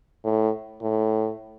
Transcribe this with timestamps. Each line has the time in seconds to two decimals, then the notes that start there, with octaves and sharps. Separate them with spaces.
0.24 A2
0.82 A2